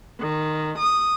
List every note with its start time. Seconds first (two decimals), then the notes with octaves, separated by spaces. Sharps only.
0.20 D#3
0.77 D#6